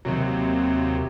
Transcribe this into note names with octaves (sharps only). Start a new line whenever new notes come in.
D#2 C3 F#3